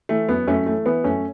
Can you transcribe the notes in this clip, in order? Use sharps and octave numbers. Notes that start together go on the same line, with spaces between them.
E3 A3
F#2 B3
F#2 A3 C#4
E3 A3
E3 B3
F#2 A3 C#4